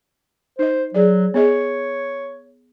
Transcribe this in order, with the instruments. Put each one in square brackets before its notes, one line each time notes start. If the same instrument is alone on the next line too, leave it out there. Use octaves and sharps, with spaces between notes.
[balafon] D#4 D#5 [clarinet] C5
[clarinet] F#3 [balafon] G#4 D5
[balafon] B3 G#4 D#5 [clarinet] C#5